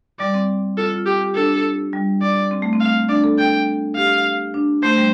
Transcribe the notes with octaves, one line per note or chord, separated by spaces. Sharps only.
G3 D5
C4
F4 A4
F4
G4
G4
D4 A4
G3
D5
C4
A3
C4
F5
D4 D5
A4
A4 G5
G4 F5
D4
A3 C5
G3